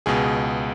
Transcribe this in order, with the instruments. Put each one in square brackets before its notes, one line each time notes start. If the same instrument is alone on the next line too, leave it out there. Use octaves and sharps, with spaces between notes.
[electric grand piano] C#2 B2 G#4